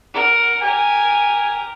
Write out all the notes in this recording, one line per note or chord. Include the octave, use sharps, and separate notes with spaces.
A#4 F#5
G4 A#4 G#5